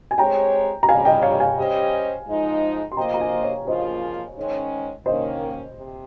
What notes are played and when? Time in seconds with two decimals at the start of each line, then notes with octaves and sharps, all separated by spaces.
0.11 G#5
0.18 G#3 C4 G4 C#5 G5 A#5
0.83 A#5
0.88 F2 C#3 G3 F5 G#5
1.05 D#5 G5
1.22 C#5 F5
1.40 F5 G#5
1.57 G3 C#4 G4 C5 D#5
2.27 G#2 F3 G#3 D#4
2.92 C6
2.97 F3 A#3 F4 C5 D#5 G5 A#5
3.14 A#5
3.21 F5 G#5
3.43 C#5 F5
3.67 C#3 F3 A#3 F4 C5 D#5
4.36 G#2 D#3 G#3 C#4
5.06 D#3 A#3 C#4 C5 D#5
5.76 C3